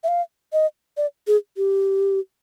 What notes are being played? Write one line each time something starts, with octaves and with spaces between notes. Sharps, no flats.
E5
F5
D#5
D5
G#4
G4